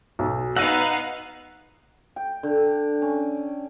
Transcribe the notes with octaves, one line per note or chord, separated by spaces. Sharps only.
B1
B3 D#4 F5 F#5 E6 A#6 D#7
G5
D3
C#4